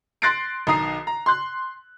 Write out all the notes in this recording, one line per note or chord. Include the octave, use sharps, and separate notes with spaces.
C6 F#6 A6 A#6 C7 D7
B1 D#3 A#5 D#6 C7
A#5
C6 F#6